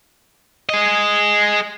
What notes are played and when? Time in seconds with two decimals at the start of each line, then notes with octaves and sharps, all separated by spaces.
0.69 G#4 D#5